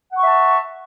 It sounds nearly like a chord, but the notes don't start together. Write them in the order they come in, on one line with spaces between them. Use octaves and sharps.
F#5 C#6 E5 A5